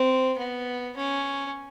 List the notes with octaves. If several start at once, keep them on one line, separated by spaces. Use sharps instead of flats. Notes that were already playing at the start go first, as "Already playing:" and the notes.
Already playing: C4
B3
C#4